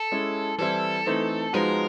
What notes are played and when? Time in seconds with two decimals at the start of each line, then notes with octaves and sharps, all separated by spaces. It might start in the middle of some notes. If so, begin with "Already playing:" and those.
Already playing: A4
0.12 G#3 C#4 E4
0.58 E3 G3 C4 E4 A4
1.06 E3 A3 C4 D#4
1.53 F3 G#3 B3 D#4 F#4 A#4